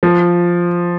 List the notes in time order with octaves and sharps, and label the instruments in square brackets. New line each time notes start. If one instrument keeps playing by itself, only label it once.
[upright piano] F3